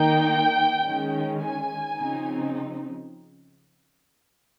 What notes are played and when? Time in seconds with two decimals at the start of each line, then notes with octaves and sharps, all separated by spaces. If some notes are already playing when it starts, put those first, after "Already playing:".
Already playing: D#3 A#3 D#4 G5
0.85 D#3 G#3 C#4
1.40 G#5
1.97 C#3 F3 C4 D#4